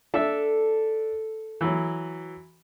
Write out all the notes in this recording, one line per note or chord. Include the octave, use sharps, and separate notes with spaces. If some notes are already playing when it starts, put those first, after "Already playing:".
D4 A4 E5
E3 F#3